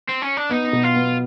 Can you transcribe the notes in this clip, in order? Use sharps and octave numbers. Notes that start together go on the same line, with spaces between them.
C4
C#4
D4
B3 D#4
B2
F4
B3